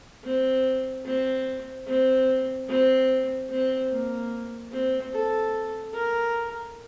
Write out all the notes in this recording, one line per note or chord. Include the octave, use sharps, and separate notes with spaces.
C4
C4
C4
C4
C4
A#3
C4
A4
A#4